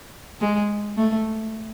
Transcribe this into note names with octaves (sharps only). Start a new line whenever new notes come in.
G#3
A3